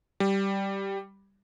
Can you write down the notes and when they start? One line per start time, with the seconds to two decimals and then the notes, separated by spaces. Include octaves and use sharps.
0.20 G3